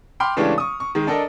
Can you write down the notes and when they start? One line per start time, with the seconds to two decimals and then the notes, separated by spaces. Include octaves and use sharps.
0.20 G5 B5 C6 D6 F6
0.37 C#3 E3 G#3 A3 D4 G4
0.58 C#6 D#6
0.80 C#6
0.95 D#3 G#3
1.07 D4 A4 A#4 D#5